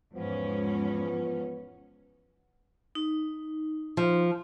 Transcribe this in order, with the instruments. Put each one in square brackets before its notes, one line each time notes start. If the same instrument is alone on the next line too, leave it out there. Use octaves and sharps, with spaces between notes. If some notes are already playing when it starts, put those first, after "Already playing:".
[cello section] E2 G#2 C#4 [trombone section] F3 B3
[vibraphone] D#4
[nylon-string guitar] F3